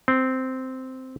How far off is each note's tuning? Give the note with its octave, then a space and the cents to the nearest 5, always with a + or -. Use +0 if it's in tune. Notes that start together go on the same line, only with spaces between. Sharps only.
C4 -10